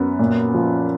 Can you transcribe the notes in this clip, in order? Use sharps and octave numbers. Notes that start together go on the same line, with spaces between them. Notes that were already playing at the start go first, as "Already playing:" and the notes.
Already playing: F#2 B3
A#2
F3